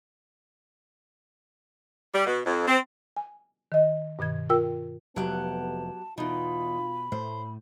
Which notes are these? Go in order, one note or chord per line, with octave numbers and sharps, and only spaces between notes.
G3
B2
F2
C4
G#5
D#3 D#5
G2 B2 D#3 G#6
F4 A#4 G5 E6
F1 F#3 B3 G4 F#5 A5
E2 B2 D#4 F4 B5
A2 A3 C5